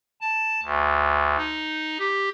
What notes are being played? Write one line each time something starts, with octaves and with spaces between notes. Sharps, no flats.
A5
D2
D#4
G4